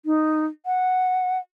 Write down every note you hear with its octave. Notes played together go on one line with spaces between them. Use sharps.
D#4
F#5